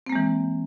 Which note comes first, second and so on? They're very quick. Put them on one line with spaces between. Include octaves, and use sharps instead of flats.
C4 A#3 G#3 E3